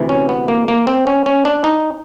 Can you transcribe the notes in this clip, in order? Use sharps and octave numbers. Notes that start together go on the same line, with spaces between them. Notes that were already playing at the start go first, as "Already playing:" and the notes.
Already playing: D2 C3 E3
C#4
B3
A#3
A#3
C4
C#4
C#4
D4
D#4